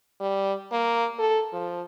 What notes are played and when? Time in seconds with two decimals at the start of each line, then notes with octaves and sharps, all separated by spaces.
0.20 G3
0.72 A#3
1.19 A4
1.53 F3